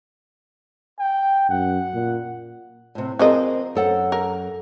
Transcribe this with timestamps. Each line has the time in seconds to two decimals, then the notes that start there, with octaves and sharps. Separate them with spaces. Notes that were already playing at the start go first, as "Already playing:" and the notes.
0.99 G5
1.49 F#2 F#5
1.94 A#2
2.95 A2 C3
3.19 F3 C4 G#4 A#4 C5 D#5
3.75 F#2 A4 F#5
4.12 A#4